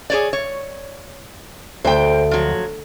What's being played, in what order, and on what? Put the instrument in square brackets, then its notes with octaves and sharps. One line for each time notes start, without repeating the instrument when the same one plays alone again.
[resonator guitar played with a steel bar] G#4 C#5 D5
C#5
[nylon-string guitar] D2 [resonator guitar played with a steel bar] C5 G5
[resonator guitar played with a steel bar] F3 F#3